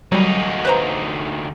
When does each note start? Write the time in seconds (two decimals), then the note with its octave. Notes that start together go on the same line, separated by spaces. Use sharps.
0.12 D2 F#3 G3 D#4
0.65 B4 C5 A#5